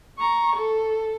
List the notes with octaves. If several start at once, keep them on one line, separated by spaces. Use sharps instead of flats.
A#5 C#6
A4